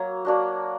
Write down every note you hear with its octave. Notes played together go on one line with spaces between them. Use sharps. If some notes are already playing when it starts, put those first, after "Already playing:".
Already playing: F#3 A#3
A#3 D4 F#4